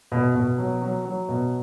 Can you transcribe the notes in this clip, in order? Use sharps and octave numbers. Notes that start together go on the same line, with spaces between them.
B2
B2
F#3
F#3
F#3
B2